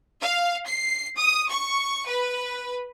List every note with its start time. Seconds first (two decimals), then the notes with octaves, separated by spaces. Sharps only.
0.21 F5
0.66 C7
1.18 D#6
1.50 C#6
2.07 B4